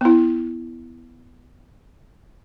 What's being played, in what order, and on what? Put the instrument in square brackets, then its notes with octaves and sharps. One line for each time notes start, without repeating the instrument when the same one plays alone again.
[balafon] B3 E4